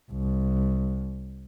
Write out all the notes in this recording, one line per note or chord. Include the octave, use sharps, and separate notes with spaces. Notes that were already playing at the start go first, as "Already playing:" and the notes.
C2